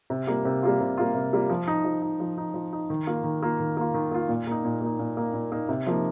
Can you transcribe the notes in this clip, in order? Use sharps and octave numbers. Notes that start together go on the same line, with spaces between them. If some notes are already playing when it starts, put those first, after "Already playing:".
C3
G3 A#3 F4
C3
G3 A#3 F4
C3
G3 A#3 F4
C3
G3 A#3 F4
F3
D#4
F3
D#4
F3
D#4
F3
D#4
D#3
A#3 F4
D#3
A#3 F4
D#3
A#3 F4
D#3
A#3 F4
A#2
A#3 D#4
A#2
A#3 D#4
A#2
A#3 D#4
A#2
A#3 D#4
C3
F3 A#3 D#4